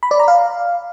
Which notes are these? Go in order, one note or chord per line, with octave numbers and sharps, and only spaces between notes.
B5
D5
A#5
F5